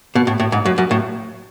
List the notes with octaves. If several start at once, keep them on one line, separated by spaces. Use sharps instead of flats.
B2
A2
A2
G#2
F#2
F#2
A2